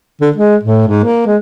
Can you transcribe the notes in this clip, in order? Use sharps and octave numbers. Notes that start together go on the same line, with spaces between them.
D3
G#3
A2
G#2
A#3
G#3